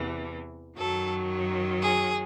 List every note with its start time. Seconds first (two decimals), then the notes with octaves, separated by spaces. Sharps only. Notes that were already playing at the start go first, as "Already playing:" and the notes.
Already playing: E2 C3 E3
0.77 F#2 D#3 F#3 A4
1.81 G#4